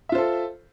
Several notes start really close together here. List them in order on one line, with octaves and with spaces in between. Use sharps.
E5 F4 C5 A4